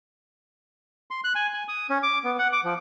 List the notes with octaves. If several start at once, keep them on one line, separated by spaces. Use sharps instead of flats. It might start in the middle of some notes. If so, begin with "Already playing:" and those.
C6
F#6
G#5
G#5
D#6
C#4
D6
B3
F#5
D6
F3